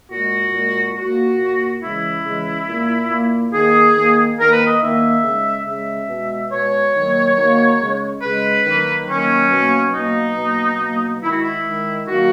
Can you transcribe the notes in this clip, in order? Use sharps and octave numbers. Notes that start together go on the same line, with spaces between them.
A#2 G#3 F#4
A#2 G#3
A#2 A#3 F#4
A#2 A#3
C#3 E3 G#3 E4
C#3 E3 G#3
A#2 A#3
A#2 A#3
D#3 A#3 G#4
D#3 A#3
D#3 A#3 A#4
B4
D#5
D#3 A#3 E5
C#3 G#3
C#3 G#3 E5
B2 G#3
B2 G#3 C#5
D#3 F#3 A#3
D#3 F#3 A#3
C#3 G#3
C#3 G#3 B4
D#3 F#3 A#3
D#3 F#3 A#3 C#4
B2 F#3 A#3
B2 F#3 A#3 D#4
B2 F#3 A#3
B2 F#3 A#3
D#3 G#3 E4
F#4
E4
D#3 G#3
D#3 F#3 A#3 F#4